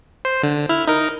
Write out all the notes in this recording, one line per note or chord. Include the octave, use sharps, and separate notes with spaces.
C5
D3
E4 F6
D#4 A#4